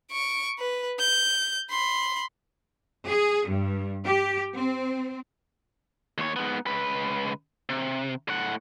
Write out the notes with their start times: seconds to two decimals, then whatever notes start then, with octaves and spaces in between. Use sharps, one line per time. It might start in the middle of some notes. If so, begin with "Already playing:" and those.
0.12 C#6 D7
0.58 B4
0.99 G6
1.71 B5 C6
3.08 G#4
3.48 G2
4.05 G4
4.53 C4
6.18 D#2 C#5
6.36 G#2 B3
6.66 C#2 B4
7.69 C3
8.28 A2 F#5